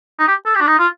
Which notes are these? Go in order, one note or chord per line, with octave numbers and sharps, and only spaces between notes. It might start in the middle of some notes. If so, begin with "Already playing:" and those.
D#4
G4
A4
G4
D4
D#4
F4